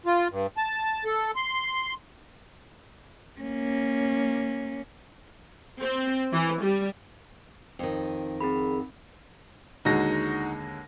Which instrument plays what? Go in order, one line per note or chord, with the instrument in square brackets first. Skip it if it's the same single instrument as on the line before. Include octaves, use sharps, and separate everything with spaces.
[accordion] F4
G2
A5
A4
C6
[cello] A#3 C#4
[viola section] C4
E3
G3
[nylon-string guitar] F2 D#3
[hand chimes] C4 A#4 B5 [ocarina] G#4
[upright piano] D#2 D3 G#3 [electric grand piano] D#4 F#4 A#6